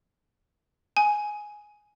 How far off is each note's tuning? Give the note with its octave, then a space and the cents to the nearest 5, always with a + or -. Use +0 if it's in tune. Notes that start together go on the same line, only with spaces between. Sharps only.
G#5 +5